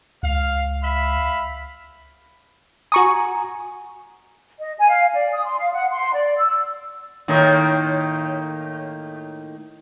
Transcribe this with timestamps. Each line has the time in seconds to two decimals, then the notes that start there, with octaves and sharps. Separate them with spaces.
0.23 C#2 F5
0.83 E5 F5 B5
2.92 F#4 G#5 A#5 C#6 D#6
4.59 D#5
4.78 G#5
4.89 F5
5.13 D5
5.33 D#6
5.45 C6
5.58 F5
5.72 F#5
5.92 C6
6.14 D5
6.38 E6
7.28 A2 D#3 A#3